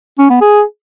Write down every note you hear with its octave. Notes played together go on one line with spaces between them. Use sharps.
C#4
B3
G#4